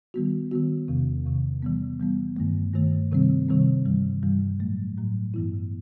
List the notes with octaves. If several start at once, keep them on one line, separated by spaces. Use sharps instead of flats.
D#3 G3 B3 F#4
D#3 G3 B3 F#4
E2 C3 D#3
E2 C3 D#3
E3 G3 B3
E3 G3 B3
G2 D#3 A3
G2 D#3 A3
C3 D#3 G3 C4
C3 D#3 G3 C4
G2 E3 G3
G2 E3 G3
A2 F#3 A3
A2 F#3 A3
G2 E3 B3 E4